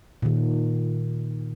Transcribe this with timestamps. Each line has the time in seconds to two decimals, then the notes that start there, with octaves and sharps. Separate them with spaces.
0.23 A#2 D#3